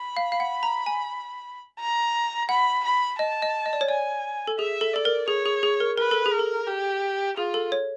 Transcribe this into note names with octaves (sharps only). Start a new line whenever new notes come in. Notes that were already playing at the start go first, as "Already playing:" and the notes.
Already playing: B5
F5
F5
F#5
A#5
G#5
A#5
F#5 B5
B5
D#5 A5
D#5
D#5
D5
C#5
D5 G#5
A4
G#4 E5
A4
A4 D5
A#4
G#4 C#5
G#4
G#4
A#4
A#4 B4
A4
G#4
A#4
A4
G4
F4 G#4
A4
C#5